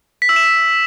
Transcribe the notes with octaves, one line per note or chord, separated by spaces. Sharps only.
B6
E6
E7